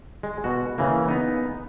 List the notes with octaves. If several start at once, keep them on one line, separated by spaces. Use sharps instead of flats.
G#3
B2 F#4
C#3 E3 A#3
B3 D#4